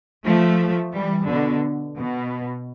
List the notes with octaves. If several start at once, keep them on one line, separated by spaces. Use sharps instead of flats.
F3 A3
E3 G3
B2 D3
B2